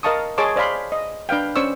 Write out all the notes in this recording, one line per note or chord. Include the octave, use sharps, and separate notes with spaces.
A#4 D#5 F5 A5 C#6 D#6
G#4 C#5 D#5 A5 C6 D6
C5 D5 F5 B5 C6
D#5
D4 B4 F5 G5
C#4 C5 D5 C#6 E6